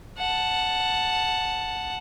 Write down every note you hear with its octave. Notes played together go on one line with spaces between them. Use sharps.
F#5 A5